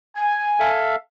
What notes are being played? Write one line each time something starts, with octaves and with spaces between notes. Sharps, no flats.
G#5
A4 E5 F5